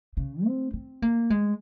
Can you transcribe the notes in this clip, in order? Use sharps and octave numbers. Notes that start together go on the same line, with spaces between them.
C#3
C4
C4
A#3
G#3